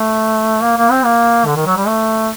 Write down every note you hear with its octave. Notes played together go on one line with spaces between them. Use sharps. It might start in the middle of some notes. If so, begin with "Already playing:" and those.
Already playing: A3
A#3
A#3
C4
A#3
D3
D#3
F#3
G3
A3